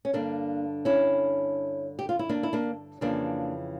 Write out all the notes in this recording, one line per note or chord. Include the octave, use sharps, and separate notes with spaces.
C#4
G2 D3 A#3 D4
C#4 E4
G4
F4
E4
A#3 D4
E4
A#3 D4
F2 C#3 E3 A#3 D4